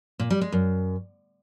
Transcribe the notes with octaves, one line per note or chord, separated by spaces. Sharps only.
A#2
G3
G#3
F#2